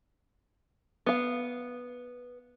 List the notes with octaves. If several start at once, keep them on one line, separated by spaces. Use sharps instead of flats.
B3 F5